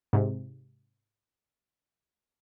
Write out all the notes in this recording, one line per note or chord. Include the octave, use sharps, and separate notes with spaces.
G#2 C3